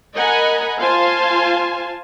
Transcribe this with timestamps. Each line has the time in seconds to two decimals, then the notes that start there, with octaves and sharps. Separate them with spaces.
0.15 A#4 D#5 F#5 G#5 A#5 B5
0.80 F4 C5 F5 G#5 A5 C6